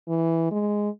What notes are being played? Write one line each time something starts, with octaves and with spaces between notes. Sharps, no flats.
E3
G#3